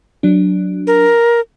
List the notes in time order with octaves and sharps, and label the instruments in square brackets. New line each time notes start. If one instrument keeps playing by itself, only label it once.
[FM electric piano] F#3 D4
[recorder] A#4